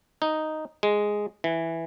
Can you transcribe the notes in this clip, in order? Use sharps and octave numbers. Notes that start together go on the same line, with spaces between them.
D#4
G#3
E3